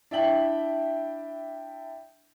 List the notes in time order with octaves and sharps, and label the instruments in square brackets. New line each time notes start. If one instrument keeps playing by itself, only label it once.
[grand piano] D4 E4 E5 G5 F#7